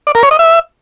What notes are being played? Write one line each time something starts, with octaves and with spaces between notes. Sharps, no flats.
D5
A#4
C#5
D#5
E5